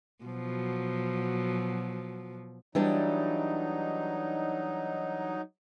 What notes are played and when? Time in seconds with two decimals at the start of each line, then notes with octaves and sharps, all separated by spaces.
0.24 B2 F3 F#3
2.75 E3 F#3 G3 D4 D#4